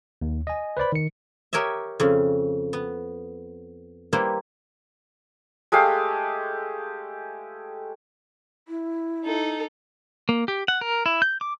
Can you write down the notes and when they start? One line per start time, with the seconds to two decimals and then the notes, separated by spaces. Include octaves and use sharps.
0.22 D#2
0.47 D#5 G#5
0.77 B4 C5 D5 B5
0.92 D#3 C#7
1.53 G4 A#4 C#5 D#5 E5
2.00 F2 C#3 C#4
2.73 B3
4.13 G3 A#3 E4 B4 C5
5.72 G#3 A3 G4 F5
8.68 E4
9.24 D#4 A4
10.29 A#3
10.48 G4
10.68 F#5
10.81 A#4
11.06 E4
11.22 G6
11.41 D6